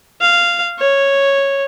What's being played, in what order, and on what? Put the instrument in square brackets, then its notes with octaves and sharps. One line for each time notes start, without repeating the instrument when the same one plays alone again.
[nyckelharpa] F5
C#5